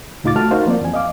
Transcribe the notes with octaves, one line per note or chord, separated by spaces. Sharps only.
C#2 A2 D#4 F4 D6 A6
A3 F#4 A5 F6
D#4 F#4 A#4 C5 F5
F3 A#3 C4 F4 D5
E2 G#5
D#5 F5 D6